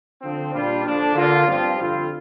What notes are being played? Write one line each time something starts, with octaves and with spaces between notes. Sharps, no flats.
D3 F3 C4
A#2 G3 D4 F4
D3 F3 D4
D3 A#3 F4
G2 F3 C4 F4
F2 D3 G3 C4 F4